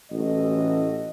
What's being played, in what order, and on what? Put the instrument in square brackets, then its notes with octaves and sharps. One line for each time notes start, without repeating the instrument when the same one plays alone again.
[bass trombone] A1 [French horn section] F#4 A4 D#5